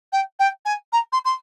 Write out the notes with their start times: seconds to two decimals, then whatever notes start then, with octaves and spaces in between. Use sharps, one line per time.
0.12 G5
0.39 G5
0.65 G#5
0.92 A#5
1.12 C6
1.25 C6